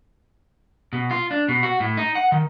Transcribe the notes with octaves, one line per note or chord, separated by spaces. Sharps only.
B2
F4
D4
B2
F#4
A2
D#4
F#5
D#3